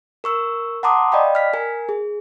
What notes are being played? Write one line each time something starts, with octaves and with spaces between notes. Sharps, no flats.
A#4 C#6 E6
F#5 A5 A#5 C6 D6 D#6
D5 D#5 F5 G5 B5
F6 B6
A#4 G#5
G#4